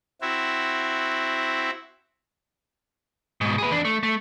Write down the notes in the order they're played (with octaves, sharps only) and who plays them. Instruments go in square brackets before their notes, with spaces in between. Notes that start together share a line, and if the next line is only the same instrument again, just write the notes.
[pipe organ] C4 E4 F#4 E5
[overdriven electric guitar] G#2 B2
G#4 B4
E2 D4
A3
A3